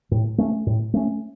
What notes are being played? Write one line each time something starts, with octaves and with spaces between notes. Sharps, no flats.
A2
A3 C#4
A2
A3 C#4